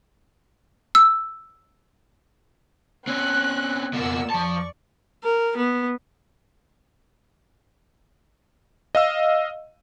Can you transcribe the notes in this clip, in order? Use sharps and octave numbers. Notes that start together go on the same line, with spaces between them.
E6
C4 C#4 F#6
F2 B2 A#3 F#5 E6
F3 D5 A5 C#6
A#4
B3
D#5 F5 E6